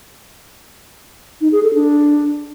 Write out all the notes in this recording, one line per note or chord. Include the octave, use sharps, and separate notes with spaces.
D#4
G#4
A4
D4